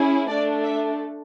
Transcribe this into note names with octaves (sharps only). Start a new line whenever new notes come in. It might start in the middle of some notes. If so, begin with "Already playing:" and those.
Already playing: C#4 E4 G#4
A3 D4 A4 D5
E5